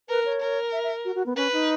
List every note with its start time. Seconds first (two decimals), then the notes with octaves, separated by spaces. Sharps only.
0.09 A#4 B4
0.25 C#5
0.41 A#4
0.72 E5
0.84 E5
1.05 F#4
1.15 F#4
1.26 B3
1.36 C#4 B4
1.52 D#4